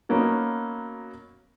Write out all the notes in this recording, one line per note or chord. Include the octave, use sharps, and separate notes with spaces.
F#3 A#3 B3 C#4 D#4